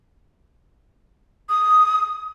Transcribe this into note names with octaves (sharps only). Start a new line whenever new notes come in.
D#6